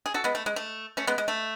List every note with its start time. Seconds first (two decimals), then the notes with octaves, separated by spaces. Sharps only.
0.06 G#4
0.14 F#4 A4
0.24 G#3 B3
0.35 A3
0.46 G#3
0.56 A3
0.97 A3 C#4
1.07 G#3 B3
1.18 G#3
1.28 A3